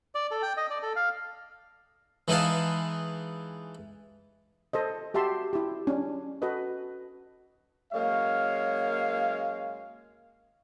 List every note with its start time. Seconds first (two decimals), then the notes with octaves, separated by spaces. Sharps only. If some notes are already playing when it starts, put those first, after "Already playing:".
0.15 D5
0.31 A4
0.42 G5
0.57 D#5
0.70 D5
0.83 A4
0.96 F5
2.28 E3 G#3 D#4 B4 F5 A5
4.73 A4 C5 D#5
5.14 F#4 G4 E5 A5 C6
5.53 E4 G4
5.87 C#4 D4
6.42 F#4 A4 B4 D#5
7.93 F#2 G#3 A#3 C#5 F5